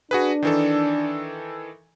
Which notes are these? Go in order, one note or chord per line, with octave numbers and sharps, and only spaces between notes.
D4 F#4 G#4 B4
D#3 E3 A4